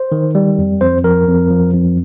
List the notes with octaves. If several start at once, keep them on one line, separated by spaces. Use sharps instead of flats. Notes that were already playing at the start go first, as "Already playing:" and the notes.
Already playing: C5
D#3
G3
F2
F2 C5
F3 A#4
F2
F3
F2